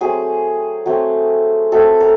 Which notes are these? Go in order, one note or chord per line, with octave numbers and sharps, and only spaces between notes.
F#3 A3 C4 G#4
F#3 A3 C4
F#3 A3 C4 A4
A#4